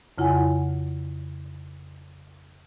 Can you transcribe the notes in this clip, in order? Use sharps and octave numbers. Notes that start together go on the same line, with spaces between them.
F2 C#3 E4 F4 F#5 G#5